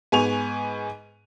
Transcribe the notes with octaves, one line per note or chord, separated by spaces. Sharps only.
G#2 B3 G#5 C#6 D#7 F7